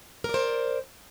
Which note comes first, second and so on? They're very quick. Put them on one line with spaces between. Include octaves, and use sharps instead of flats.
A#4 D5 C5